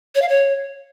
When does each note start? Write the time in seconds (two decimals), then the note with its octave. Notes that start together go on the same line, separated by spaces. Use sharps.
0.15 C#5
0.22 F5
0.28 C#5